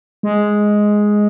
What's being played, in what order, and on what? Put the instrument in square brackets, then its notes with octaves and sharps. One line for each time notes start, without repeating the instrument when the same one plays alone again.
[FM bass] G#3